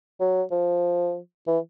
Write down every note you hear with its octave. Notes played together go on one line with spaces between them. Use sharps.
F#3
F3
E3